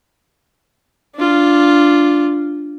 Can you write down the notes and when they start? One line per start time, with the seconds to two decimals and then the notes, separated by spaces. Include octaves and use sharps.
1.16 D4 F4